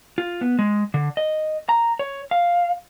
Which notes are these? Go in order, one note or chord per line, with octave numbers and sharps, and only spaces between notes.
F4
B3
G#3
D3
D#5
A#5
C#5
F5